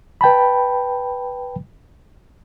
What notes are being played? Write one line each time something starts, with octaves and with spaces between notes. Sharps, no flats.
B4 G5 A5 B5